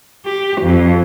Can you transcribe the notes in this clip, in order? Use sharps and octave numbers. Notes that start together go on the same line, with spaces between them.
G4
F2